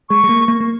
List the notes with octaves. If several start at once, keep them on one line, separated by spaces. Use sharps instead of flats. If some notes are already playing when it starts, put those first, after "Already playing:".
G#3 C#6
G#3
A#3
A#3
A#3